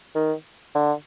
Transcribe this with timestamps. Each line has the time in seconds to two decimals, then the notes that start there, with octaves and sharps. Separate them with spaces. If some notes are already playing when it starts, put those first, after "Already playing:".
0.16 D#3
0.75 D3